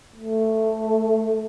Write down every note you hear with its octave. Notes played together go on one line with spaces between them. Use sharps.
A3